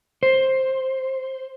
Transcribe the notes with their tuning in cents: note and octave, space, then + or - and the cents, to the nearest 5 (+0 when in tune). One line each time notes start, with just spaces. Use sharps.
C5 +10